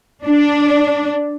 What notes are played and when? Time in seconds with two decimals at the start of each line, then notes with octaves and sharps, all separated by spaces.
0.25 D4